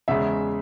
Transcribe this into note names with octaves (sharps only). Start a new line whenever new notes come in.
E2 C#3 G#3 E5